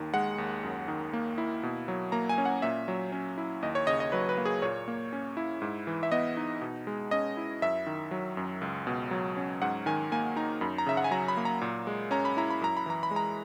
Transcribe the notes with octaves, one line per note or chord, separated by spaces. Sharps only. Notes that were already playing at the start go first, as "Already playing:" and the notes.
Already playing: D#2 D#3
G#3 F#5
D#2
F#2
D#3
A#3
E4
B2
F#3
A#3 A#5
G#5
C#4
F#5
A#2 E5
F#3
C#4
E4
D#2 D#5
C#5
C#3 D#5
D#5
F#3 B4
B4
A#3
G#4
A#2 C#5
A#3
C#4
E4
G#2
E3
E5
B3 D#5
D#4
B2
G#3
C#4 D#5
E4
F#2 E5
D#3
F#3
F#2
C#2
B2
F#3
C#4
G#2 F#5
D#3 G#5
A#3 G#5
D#4 A#5
F#2 B5
A#5
C#3 E5
F#5
G#5
F#3 A#5
B5
A#3
A#5
A#2
G#3
C#4 A#5
B5
E4 A#5
B5
F#2 A#5
B5
E3 A#5
B5
G#3
A#5